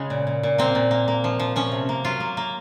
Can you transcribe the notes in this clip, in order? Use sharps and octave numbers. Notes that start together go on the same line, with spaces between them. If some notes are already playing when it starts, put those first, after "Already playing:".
Already playing: C#3 G#3
A#2
A#2
A#2
A#3 C4
A#2
A#3
A#3
F3
F3
F3 C#4
C3
A#3
F#3 F4
A#3
A#3